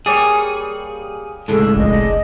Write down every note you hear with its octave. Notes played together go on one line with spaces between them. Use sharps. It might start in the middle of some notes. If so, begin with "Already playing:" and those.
G3 A#3 G#4 C#5
C#2 A2 G#3 D4 A4
F1 B1 D#5